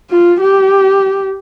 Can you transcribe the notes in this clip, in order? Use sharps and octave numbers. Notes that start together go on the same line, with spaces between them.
F4
G4